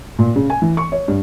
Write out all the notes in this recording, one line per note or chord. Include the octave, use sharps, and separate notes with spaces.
A#2
C#3
G#5
E3
C#6
C#5
G2